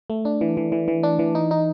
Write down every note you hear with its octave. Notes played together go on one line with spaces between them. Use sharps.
A3
D4
E3
E3
E3
E3
D4
E3
D#4
D#4